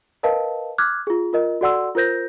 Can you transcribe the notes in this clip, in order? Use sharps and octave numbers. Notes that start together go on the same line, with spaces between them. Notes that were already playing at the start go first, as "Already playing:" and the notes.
A#4 B4 D#5 F5 A5
D6 F6 F#6 G#6
F4 G#4
F4 A#4 D#5
F#4 A4 D5 F#5 C6 E6
F4 A#4 C5 G6 A#6